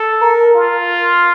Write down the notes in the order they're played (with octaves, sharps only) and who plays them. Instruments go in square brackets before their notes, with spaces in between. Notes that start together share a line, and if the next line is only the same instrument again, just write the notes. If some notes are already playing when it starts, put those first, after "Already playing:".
Already playing: [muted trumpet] A4
[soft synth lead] A#4
[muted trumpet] F4